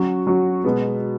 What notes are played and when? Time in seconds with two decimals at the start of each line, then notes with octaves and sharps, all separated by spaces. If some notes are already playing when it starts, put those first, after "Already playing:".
Already playing: F#3 C#4 F#4
0.27 F#3 C#4 F#4
0.64 B2 G#3 B3